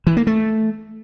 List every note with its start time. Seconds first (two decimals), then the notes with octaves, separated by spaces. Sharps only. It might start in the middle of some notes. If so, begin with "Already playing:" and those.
0.07 E3
0.17 A#3
0.27 A3